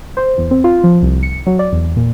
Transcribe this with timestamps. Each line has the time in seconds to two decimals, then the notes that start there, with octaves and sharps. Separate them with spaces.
0.17 C5
0.38 E2
0.51 C4
0.64 F4
0.84 F3
1.03 C2
1.23 C#7
1.46 F#3
1.59 D5
1.72 E2
1.96 A#2